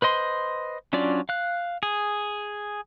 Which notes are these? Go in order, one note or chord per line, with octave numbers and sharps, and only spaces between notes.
B4 C5 D#5 C6
F#3 C#4 D4 F4 D5
F5 F#6
G#4